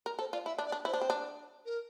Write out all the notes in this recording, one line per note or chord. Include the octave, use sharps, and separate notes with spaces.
A#4
A4 C5
F4 D5
E4 E5
D4
D5
D4
E4 C5
D4
C4
D4
A#4